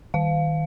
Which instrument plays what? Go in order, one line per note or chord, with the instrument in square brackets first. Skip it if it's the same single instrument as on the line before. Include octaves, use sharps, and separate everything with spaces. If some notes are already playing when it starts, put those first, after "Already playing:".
[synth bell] D#3 F5